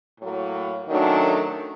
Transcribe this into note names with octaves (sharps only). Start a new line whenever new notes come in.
A2 F#3 A#3
F#2 D#3 F#3 A3 D4